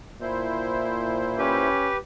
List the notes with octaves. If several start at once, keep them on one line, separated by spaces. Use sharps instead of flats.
A#2 E4 C5
C#4 G4 B4